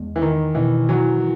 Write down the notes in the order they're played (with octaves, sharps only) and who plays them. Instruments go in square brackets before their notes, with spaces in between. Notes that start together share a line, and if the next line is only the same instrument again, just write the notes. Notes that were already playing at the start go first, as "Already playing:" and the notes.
Already playing: [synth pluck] E2 G#3
[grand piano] E3
[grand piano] D#3 [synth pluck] D#4
[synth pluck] B2 [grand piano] E3
[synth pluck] E3 [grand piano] F#3